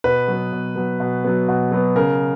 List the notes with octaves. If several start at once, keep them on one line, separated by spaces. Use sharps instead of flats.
B2 B4
F#3 B3
B2
F#3 B3
B2
F#3 B3
B2
F#3 B3
C#3 A#4